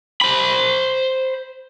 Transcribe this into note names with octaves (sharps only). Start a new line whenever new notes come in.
C5 B5